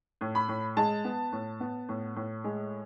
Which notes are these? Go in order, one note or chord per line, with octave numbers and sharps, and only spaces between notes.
A2
B5
A2
G#3 A5
B3
A2
B3
A2
A2
G#3